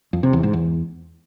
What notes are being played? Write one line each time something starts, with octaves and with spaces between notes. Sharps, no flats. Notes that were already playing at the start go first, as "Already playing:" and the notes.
F2
C3
E2
G#2
E2